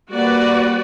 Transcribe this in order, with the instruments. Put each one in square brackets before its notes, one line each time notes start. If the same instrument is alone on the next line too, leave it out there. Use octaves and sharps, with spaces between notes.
[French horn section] G3 A#3 [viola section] F#4 B4 D5